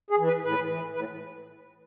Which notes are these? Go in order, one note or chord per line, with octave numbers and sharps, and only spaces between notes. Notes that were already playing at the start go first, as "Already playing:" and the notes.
G#4
E3
B4
A2 B4
E3
A2 B4